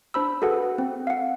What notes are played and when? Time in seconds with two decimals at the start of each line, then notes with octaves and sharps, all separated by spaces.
0.14 D4 C5 B5 E6
0.42 F#4 G#4 A4 B4 F#5
0.78 C4
1.07 F5 F#5